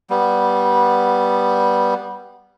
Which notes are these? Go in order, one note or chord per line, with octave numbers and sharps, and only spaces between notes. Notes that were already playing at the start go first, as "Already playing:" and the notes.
G3 B3